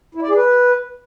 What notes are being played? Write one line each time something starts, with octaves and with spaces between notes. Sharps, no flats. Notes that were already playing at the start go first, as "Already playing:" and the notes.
E4
D5
G#4
B4